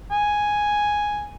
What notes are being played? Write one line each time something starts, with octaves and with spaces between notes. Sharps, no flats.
G#5